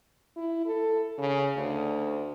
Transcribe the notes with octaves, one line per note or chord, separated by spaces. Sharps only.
E4
A4
C#3
D2